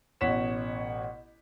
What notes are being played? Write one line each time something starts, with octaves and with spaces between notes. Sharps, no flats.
A1 B2 C#5 F#5 B6 E7